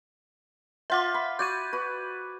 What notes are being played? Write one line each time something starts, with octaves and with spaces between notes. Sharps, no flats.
F4 C5 E5 F#5 D6
B5
F#4 D5 G6 G#6 D#7
F#4 B4